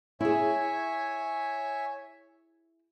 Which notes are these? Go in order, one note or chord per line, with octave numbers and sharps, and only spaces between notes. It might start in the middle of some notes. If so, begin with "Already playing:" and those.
E4 G#4 C#5 E5 G#5